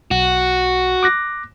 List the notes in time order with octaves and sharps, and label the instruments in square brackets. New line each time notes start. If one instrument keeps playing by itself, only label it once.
[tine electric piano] B1 [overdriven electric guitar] F#4
[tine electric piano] D6 F#6 A#6